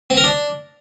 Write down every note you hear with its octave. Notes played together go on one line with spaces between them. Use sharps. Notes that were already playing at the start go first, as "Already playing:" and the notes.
C4
A#4
D4